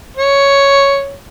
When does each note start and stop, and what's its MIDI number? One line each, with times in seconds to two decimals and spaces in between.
0.17 1.15 73